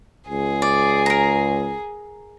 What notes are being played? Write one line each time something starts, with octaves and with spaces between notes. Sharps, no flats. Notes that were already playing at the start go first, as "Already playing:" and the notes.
C#2 G#4
D5
A#4 A#5